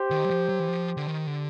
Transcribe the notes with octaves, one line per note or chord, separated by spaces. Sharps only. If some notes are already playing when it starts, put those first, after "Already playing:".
Already playing: G4 C5
D#3
F#3
F3
F#3
E3
F3
D3
D#3
D3